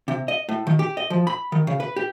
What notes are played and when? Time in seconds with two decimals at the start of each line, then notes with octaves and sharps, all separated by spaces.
0.08 C3
0.28 D#5
0.49 A2
0.67 D#3
0.79 G4
0.97 D#5
1.10 F3
1.27 B5
1.52 D#3
1.67 C#3
1.80 B4
1.96 G4